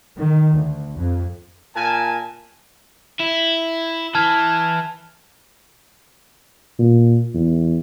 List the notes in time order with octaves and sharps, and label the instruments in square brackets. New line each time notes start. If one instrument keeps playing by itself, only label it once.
[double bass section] D#3
D2
F2
[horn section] A#2 A#4 G#5 A5
[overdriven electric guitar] E4
[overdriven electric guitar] E3 [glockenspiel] A5 F6 G#6
[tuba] A#2
E2